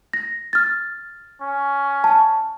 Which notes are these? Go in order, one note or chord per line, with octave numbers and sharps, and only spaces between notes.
A#6
F6 A6
C#4
A5